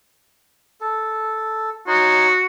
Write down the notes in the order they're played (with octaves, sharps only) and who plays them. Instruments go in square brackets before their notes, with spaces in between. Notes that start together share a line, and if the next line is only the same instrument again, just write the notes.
[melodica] A4
[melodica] D#4 C#5 C6 [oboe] F#4